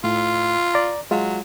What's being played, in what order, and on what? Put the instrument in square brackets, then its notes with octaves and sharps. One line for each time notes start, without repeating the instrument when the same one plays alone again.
[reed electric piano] A2 [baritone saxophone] F4
[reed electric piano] D5 A#5
[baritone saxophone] F#3 [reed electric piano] G#3 F4